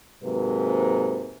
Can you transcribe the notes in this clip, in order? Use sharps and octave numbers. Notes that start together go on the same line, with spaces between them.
G#2 C3 F#3 A#3 B4